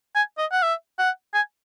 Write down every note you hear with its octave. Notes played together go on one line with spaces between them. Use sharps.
G#5
D#5
F#5
E5
F#5
G#5